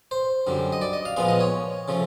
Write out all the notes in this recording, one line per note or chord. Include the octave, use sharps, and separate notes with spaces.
C5
F#2 D3 G3
D#5
D5
D#5
F5
A#2 F3 G#3 B3 F5
D#5
C#5
C#3 F3 A3